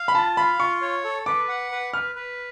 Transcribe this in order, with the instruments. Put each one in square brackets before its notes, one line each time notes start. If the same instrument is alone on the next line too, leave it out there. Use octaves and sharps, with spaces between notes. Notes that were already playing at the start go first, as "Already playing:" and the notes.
Already playing: [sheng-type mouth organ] F5
[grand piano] B5
[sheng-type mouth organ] F4 [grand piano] A5
[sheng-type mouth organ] F5 [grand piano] B5
[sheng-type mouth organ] F4 [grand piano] C#6
[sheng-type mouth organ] C#5
A4
[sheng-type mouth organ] B4 [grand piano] D6
[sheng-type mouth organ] F#5
B4
[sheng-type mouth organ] B4 [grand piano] F6
[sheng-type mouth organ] B4